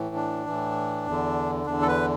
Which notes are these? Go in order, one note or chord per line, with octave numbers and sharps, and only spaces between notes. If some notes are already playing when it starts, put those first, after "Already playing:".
Already playing: A2 E3
D4
A2 E3
E2 D3
E2 D3 D4
A4
B4